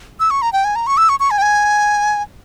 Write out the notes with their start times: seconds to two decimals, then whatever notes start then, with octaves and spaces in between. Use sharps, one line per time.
0.20 E6
0.31 C#6
0.42 A#5
0.53 G5
0.65 G#5
0.76 A#5
0.87 C#6
0.97 E6
1.09 C#6
1.20 C#6
1.31 G#5
1.38 G5
1.42 G#5